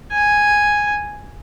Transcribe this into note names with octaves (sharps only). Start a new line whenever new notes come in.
G#5